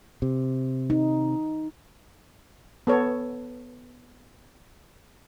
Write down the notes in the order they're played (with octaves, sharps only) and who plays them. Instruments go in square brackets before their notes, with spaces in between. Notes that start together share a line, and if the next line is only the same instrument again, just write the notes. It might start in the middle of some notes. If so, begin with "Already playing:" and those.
[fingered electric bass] C3
[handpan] D#4
[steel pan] B3 A4 C#5